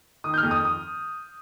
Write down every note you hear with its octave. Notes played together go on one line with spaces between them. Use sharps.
D#3 D#6
G6
F6
F2
D#6
D#6